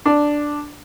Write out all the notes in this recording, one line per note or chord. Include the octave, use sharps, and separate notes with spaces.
D4